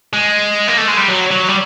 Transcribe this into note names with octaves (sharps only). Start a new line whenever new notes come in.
G#3
A#3
A3
G#3
G3
F#3
F#3
G3